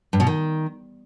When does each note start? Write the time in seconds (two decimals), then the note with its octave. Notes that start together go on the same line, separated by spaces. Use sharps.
0.13 G2
0.20 B2
0.27 D#3